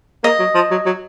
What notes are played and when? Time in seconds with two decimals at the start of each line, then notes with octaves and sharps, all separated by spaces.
0.24 A#3 D#5
0.39 F#3
0.55 F3
0.71 F#3
0.86 F#3